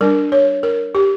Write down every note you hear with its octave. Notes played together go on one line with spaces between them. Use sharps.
G3 D4 A#4
C#5
A#4
G4